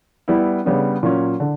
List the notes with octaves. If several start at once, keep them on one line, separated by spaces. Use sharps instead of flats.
G3 B3 E4
C#3 G3 B3 D4
A#2 F#3 C#4
D3